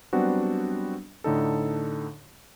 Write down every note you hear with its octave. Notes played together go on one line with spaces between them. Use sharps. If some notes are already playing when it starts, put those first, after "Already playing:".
F#3 G3 B3 C4 D4 F#4
A2 D3 D#4 A4